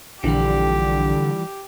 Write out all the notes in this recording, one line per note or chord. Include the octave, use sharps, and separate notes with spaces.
A#1 D3 E3 F3 G3 G4